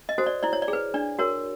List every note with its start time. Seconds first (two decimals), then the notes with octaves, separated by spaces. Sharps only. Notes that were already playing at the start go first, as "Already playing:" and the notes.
0.09 D#5
0.18 F#4 A4 C5
0.26 D5
0.43 E4 D5
0.53 C#5
0.62 D5
0.68 G#4
0.73 B4
0.94 D4 D5
1.19 F#4 A#4 C#5